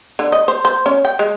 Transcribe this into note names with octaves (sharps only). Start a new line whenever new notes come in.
D3
D#5
C5
C5
C#4
G5
G#3